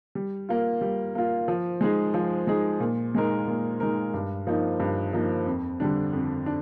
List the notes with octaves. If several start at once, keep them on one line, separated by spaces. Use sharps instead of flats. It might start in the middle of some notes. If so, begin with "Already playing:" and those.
G3
A#3 F4
G3
A#3 F4
F3
G#3 D#4 G#4
F3
G#3 D#4 G#4
A#2
G#3 D#4 A#4
A#2
G#3 D#4 A#4
G2
F3 A#3 D#4
G2
F3 A#3 D#4
F2
D3 G3 D4
F2
D4